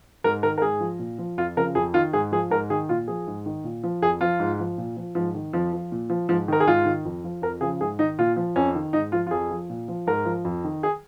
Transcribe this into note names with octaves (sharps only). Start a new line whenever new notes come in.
G#2 A#4
D#3 A#4
A#4
G#2 G#4
F3
A#2
F3
F2 F4
C#3 F3 A#4
F2 G#4
D#3 F4
G#2 G#4
F3 G#4
G#2 A#4
D#3 G#4
A#2 F4
F3 G#4
G#2
D#3
A#2
F3
F2 G#4
F3 F4
G#2
F3
A#2
F3
G#2 F3
D#3
F2 F3
F3
A#2
F3
G#2 F3
D#3 A#4
G#4
G#2 F4
D#3
F2
F3
F2 A#4
C#3 F3 G#4
G#2 G#4
D#3 D#4
A#2 F4
F3
F2 C#4
D#3
G#2 D#4
F3 F4
F4
F2 G#4
F3
A#2
F3
G#2 A#4
F3
F2
D#3
G#4